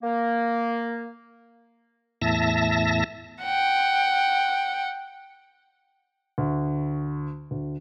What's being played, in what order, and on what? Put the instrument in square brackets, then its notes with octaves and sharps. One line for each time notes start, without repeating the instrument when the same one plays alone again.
[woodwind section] A#3
[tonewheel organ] E2 A2 E5 A5 A#6
[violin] F#5 G5
[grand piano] D2
D2